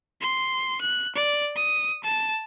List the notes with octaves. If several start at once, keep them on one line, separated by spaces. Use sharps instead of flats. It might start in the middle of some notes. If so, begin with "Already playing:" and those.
C6
F#6
D5
D#6
A5